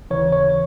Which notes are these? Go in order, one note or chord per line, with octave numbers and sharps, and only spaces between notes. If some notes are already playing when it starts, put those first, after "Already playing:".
D#2 C#3 E3 C#5
C#5